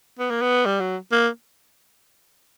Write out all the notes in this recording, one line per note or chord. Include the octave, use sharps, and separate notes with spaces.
B3
A#3
B3
G3
F#3
A#3